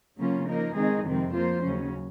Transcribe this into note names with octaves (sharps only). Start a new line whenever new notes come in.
C#3 F#3 A#3 C#4 F4
F3 A#3 D#4 A#4
D#3 G#3 C4 D#4 G#4
F2 C3 D#3 G#3 C4
F3 A#3 F4 C5
D#2 C#3 F#3 C#4